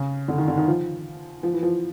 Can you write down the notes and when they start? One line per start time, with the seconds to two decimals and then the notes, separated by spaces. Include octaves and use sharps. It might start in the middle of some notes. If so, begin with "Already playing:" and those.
Already playing: C#3
0.28 D3
0.38 D#3
0.48 D3
0.57 D#3
0.67 F3
1.43 F3
1.53 E3
1.63 F3